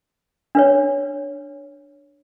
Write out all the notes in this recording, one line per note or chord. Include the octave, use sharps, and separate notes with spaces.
D4 B4 C#5